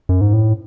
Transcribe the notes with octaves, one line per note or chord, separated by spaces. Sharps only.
F#2
G#2
A2